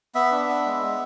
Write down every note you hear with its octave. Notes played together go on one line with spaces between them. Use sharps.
B3 E5
D4
B3
G#3
B3